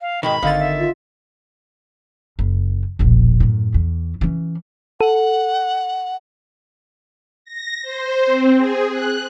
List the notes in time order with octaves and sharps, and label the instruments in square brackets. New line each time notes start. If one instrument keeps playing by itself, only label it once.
[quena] F5
[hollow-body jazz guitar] G#2 B2 D#3 [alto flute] G5 [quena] B5
[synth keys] G#1 D3 A6 [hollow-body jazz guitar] D#3 [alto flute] F5
[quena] E5
[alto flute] F4
[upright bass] F#1
E1 A#1
F#2 A2
E2
E3 C#4
[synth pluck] A4 [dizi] F#5
[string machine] A#6
C5
C4
G#4
F#6